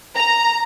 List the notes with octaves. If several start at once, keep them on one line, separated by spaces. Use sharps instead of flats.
A#5